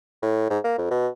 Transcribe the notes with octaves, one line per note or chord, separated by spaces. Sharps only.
A2
G#2
A#3
F2
B2